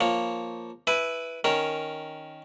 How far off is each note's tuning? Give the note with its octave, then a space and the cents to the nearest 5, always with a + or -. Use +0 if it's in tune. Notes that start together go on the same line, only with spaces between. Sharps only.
F3 +0 A#3 +0 C#5 +0
E4 +0 B4 +0 G#5 +30
D#3 +0 C#4 +0 A#4 +0